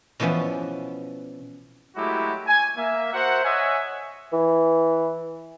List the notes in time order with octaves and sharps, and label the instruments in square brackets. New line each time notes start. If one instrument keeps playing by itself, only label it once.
[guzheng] B2 E3 F3 B3 C#4
[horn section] F#3 G#3 A3 E4 F#4 G4
G#5
A#3 E5
F#4 A#4 C5 E5 F#5
C#5 D#5 E5 F#5 G#5
[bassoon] E3